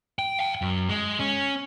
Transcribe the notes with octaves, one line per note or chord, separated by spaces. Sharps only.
G5
F5 G5
F#2
G#3
C#4